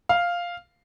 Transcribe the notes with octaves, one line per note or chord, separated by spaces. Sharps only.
F5